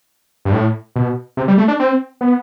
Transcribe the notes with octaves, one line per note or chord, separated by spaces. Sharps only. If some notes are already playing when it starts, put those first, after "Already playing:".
G2
A2
B2
C3
G3
A3
D4
C4
B3